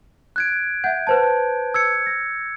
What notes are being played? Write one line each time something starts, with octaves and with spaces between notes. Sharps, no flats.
F#6 G#6 D7
E5 F#5 G6
B4 C5 A5
E6 G#6 C#7
A#6